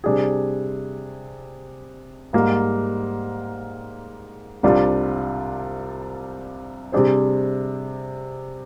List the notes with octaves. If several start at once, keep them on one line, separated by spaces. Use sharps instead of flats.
C3 G3 D4 G#4
G#2 G3 A#3
C2 C3 G3 D4 F4
C3 G3 D4 G#4 C5